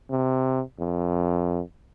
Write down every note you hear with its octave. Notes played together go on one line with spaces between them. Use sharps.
C3
F2